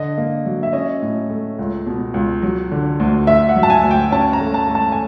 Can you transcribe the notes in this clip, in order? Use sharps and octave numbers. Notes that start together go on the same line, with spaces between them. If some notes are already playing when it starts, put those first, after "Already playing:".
Already playing: D3 D#5
A#3
F#3
E5
C#4 D#5
A2
A3
C#2
B2
C#2
F#3
D3
D2
D2 E5
F#5
F#3
A5
G#5
D2
G5
C#4 A5
A#5
A3
A5
A3
A5
G#5